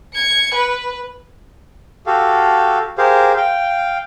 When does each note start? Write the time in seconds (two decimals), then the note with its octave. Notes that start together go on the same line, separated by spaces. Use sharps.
0.14 G#6 C#7
0.54 B4
2.06 F#4 G4 A4 F5
2.98 G4 G#4 A#4 C5 F5
3.37 F5 G5